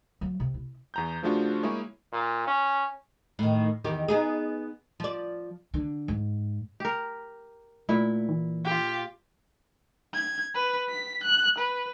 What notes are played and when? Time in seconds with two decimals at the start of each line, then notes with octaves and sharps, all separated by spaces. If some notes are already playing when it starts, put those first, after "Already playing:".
0.21 F#3
0.40 C3
0.54 E4
0.94 E2 A#5 G6
1.23 C#3 F3 A3 D4 F4 F#4
1.63 G#3 A#3 E4 G#4 C#5
2.12 A#2
2.47 C#4
3.39 A2 D#3
3.84 E2 D#3 G4
4.08 B3 D#4 G#4
5.00 F3 D5
5.74 D3
6.08 G#2
6.80 G4 A#4
7.89 A#2 A3 E4
8.29 E3
8.64 F4 G4
10.14 G#6
10.55 B4
10.90 B6
11.23 F#6
11.58 B4